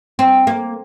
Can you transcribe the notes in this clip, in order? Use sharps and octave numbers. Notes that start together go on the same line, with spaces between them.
C4
A#3